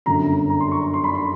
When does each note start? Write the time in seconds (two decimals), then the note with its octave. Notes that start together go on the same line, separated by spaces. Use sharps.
0.06 G1 F#2 D3 A#5
0.50 A#5
0.60 C6
0.71 C#6
0.82 C6
0.94 C6
1.04 B5
1.15 C6